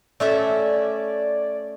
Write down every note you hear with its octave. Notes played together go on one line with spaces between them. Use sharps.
A3 C#4 D5 E5